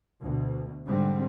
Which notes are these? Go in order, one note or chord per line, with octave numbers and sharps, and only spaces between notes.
D2 B2
G#2 D3 G3 C4